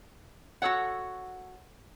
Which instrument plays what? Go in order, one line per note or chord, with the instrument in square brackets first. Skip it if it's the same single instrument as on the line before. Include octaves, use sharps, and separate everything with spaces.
[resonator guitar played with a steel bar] F#4 G#4 A4 C#5 F#5